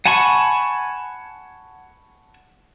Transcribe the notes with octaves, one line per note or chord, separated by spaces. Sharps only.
F#5 G#5 A5 B5 C#6